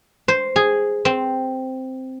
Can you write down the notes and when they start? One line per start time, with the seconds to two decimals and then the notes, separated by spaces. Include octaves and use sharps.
0.28 C5
0.56 G#4
1.05 C4